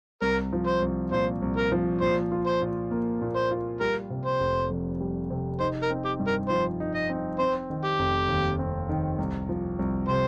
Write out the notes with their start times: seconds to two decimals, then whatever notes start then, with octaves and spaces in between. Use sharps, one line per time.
0.22 C2 A#4
0.53 F3
0.67 C5
0.82 C2
1.12 A#2 C5
1.42 C2
1.57 A#4
1.72 F3
2.01 A#2 C5
2.32 F4
2.46 C5
2.61 A#2
2.91 A#3
3.22 A#2
3.36 C5
3.51 F4
3.81 G3 A#4
4.10 C3
4.25 C5
4.40 F1
4.70 F2
5.00 G3
5.30 C3
5.60 D#4 C5
5.83 A#4
5.90 C4
6.05 G4
6.20 G2
6.27 A#4
6.49 F3 C5
6.80 D#4
6.95 D#5
7.10 C4
7.39 C4 C5
7.70 D#3
7.84 G4
7.99 F1
8.28 D#2
8.59 C4
8.89 D#3
9.19 C2
9.49 F3
9.79 C2
10.08 C3 C5